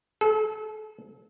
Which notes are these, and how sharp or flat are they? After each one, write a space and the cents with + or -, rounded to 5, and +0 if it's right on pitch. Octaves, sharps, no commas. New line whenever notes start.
A4 -35